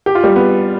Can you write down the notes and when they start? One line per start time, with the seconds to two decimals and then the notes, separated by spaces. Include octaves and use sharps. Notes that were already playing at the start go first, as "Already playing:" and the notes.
0.06 G4
0.15 F4
0.24 G3 G4
0.36 B3